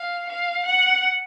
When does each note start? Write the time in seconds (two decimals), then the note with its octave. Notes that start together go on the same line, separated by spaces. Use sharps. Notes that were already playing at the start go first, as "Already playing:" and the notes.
Already playing: F5
0.30 F5
0.66 F#5